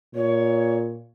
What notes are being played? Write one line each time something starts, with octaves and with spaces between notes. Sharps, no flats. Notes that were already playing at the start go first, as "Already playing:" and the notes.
A#2 C#5